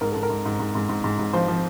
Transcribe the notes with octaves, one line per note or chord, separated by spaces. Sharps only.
G#2 A#4
G#2 A4
A#4
G#2
G#2
G#2
G#2
G#2
G#2
G#2
F3 C5
F3